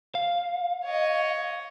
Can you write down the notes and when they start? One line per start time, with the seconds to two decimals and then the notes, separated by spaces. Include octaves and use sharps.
0.15 F5
0.85 C#5 D#5